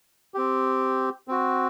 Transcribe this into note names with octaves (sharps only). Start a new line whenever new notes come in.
C4 G4
C4 F#4